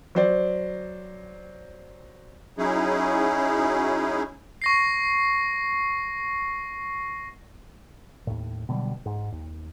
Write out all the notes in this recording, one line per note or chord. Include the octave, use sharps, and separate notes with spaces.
F#3 C5 D5
F#3 C#4 D#4 E4 G#4
C#6 A#6 C7
D#2 A2
B2 D3 F#3 G3
G#2
D#2